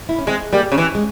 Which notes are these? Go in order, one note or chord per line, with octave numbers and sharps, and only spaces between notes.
E4
C#4
G#3 C4
G3 A#3
C#3
E3 C4
G#3